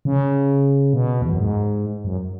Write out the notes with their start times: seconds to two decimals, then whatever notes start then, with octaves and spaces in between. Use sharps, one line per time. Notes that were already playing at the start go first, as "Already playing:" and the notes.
0.05 C#3
0.93 B2
1.21 E2
1.30 F#2
1.39 G#2
2.05 F#2